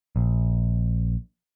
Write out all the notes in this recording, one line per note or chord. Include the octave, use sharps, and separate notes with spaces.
A#1